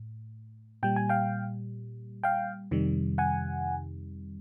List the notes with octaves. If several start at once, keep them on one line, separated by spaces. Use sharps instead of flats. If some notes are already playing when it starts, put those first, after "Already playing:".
Already playing: A2
A#2 G3 G5
G#5
F5 G5
F5 G5
F2 C3 D#3 G3
F#5 G#5